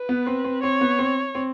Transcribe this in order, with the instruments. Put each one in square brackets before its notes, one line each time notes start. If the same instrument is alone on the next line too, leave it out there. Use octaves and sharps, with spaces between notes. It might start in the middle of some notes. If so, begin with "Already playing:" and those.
Already playing: [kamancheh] B4
[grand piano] B3
C4
C4
[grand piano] C4 [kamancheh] C#5
[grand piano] B3
C4
C4